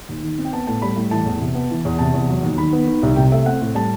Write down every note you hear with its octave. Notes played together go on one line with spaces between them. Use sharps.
D#2
D#3
C4
G5
B3 A5
A2 A5
G3 B5
A2
E3 A5
E2
C3
B3
E3
E2
C3 A5
E2
F#3
D#2
D#3 B5
B3
D#3
C2
C3 G5
A3 E5
C4 F#5
A2
G3 A5